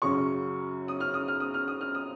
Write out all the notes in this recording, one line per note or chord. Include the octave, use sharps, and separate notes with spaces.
F#2 C#3 F#3 C#4 C#6
D#6
F6
D#6
F6
D#6
F6
D#6
F6
D#6